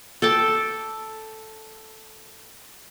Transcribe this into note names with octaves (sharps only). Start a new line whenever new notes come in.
A4 G5 A5 D6